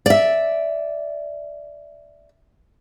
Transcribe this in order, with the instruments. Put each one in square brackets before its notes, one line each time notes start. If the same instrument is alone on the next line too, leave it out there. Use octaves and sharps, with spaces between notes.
[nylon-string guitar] D5 E5